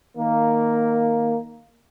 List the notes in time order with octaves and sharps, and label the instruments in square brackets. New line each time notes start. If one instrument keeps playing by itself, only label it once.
[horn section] D#3 A#3